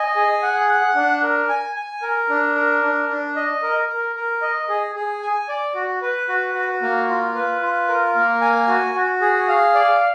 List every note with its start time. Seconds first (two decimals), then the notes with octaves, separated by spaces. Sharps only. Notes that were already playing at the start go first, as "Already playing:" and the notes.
Already playing: D#5 G#5
0.16 G#4
0.43 F#5
0.69 F#5
0.95 D4
1.23 A#4
1.49 G#5
1.76 G#5
2.02 A#4
2.29 D4
2.56 A#4
2.83 D4
3.09 D4
3.36 D#5
3.62 A#4
3.89 A#4
4.16 A#4
4.42 D#5
4.69 G#4
4.95 G#4
5.22 G#5
5.49 D5
5.75 F#4
6.02 B4
6.29 F#4
6.55 F#4
6.82 A#3
7.09 F4
7.35 B4
7.61 F4
7.89 A#4
8.16 A#3
8.41 G#5
8.68 F#4
8.95 F#4
9.21 G#4
9.48 F5
9.75 D5